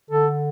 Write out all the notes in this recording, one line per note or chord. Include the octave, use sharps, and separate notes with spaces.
D3 A4